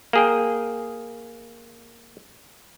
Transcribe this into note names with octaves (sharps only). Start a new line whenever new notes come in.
A#3 G#4 G5